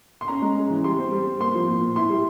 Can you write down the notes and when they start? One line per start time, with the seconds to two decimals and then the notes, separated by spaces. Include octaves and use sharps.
0.21 C6
0.28 C#4 A#5
0.42 G#3
0.57 C#4
0.70 E3
0.84 G3 C6
0.98 C4
1.12 G3
1.26 C4
1.40 A#3 C6
1.55 F3
1.68 A#2
1.81 A#2
1.96 E4 C6
2.10 G3